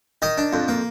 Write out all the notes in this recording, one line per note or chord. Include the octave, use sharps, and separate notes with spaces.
D#3 D#5
D4
F2
A#3